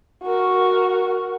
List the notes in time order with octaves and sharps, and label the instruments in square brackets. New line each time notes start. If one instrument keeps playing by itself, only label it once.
[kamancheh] F#4 A#4